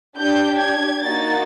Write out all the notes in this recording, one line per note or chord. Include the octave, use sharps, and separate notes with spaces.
D4 G4 G6
G#6
A#3 D#4 F#4 A6